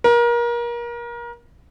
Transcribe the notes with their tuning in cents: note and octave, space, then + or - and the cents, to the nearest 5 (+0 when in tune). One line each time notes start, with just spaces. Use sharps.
A#4 +30